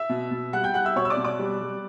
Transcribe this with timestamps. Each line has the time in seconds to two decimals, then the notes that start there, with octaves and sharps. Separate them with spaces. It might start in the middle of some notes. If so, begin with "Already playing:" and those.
Already playing: E5 E6
0.09 B2
0.31 B2
0.53 G3 F#5 F#6
0.64 G5 G6
0.74 G3 F#5 F#6
0.85 E5 E6
0.96 B2 C#5 C#6
1.05 E6
1.10 D5 D6
1.17 B2
1.24 D5 D6
1.39 G3
1.61 G3